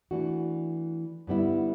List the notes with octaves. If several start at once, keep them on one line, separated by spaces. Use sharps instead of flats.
E3 A3 D4 F#4
G2 D3 G3 B3 E4